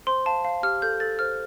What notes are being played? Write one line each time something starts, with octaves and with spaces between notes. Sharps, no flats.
C5 C6
F5 A5
F5
G4 F6
A4 G6
A4 A6
C5 F6